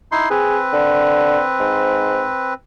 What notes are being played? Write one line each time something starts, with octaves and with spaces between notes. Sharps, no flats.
D#4 E4 C6
C4 G#4 B4
D3
G#2